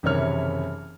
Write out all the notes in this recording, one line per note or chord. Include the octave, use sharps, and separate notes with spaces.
F#1 C3 D#3 E3 C#5 F6